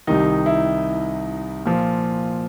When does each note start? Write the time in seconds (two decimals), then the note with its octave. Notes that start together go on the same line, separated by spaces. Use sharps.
0.07 C2 C3 D#3 D#4
0.46 E4
1.66 A#2 F3